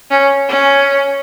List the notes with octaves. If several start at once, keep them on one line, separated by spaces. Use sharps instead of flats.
C#4
C#4